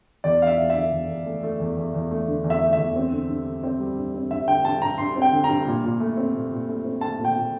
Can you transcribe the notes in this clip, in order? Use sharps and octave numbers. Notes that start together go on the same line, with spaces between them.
E2 D5
E2 F5
E5
E2
D3 E5
E2
E2
A3
A3
E2
E2
E2
A3
D3
E2
E5
A3
E5
E2
C4
D3
G2
D3
C4
G3
G2
C4
G2 E5
D3 G5
G2 A5
G2 A#5
G2 C6
C4
G5
D3
A#5
G2
A#2
A#2
A3
C4
A#2
A#2
A3
C4
A3 A5
A#2
G5
A#2